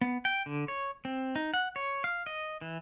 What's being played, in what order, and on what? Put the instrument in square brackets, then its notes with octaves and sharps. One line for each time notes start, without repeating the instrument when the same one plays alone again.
[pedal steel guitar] B3
G5
D3
C#5
C4
D#4
F#5
C#5
F5
D#5
E3